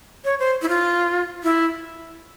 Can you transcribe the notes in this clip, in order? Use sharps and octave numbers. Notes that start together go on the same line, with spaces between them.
C#5
C5
E4
F4
E4